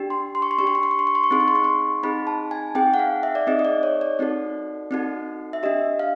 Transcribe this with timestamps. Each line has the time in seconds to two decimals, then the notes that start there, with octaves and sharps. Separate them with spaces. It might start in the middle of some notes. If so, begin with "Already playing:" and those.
Already playing: D4 G4
0.10 C6
0.35 C6
0.42 C#6
0.51 C6
0.58 D4 G4 C#6
0.67 C6
0.75 C#6
0.83 C6
0.91 C#6
0.99 C6
1.07 C#6
1.15 C6
1.24 C#6
1.31 C4 D#4 G#4 C6
1.40 C#6
1.48 C6
1.55 C#6
1.64 C6
2.03 C4 D#4 G#4 B5
2.27 A5
2.51 G#5
2.75 C4 D#4 G#4 G5
2.94 F#5
2.99 F5
3.23 E5
3.35 D5
3.47 C4 D#4 G#4 D#5
3.59 D#5
3.65 D5
3.83 C#5
4.01 D5
4.19 C4 D#4 F#4 A4
4.91 C4 D#4 F#4 A4
5.53 E5
5.63 D4 G4 D#5
5.99 F5